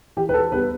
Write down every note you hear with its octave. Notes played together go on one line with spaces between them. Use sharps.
E3 G4
B4
A4
G3 B3 B4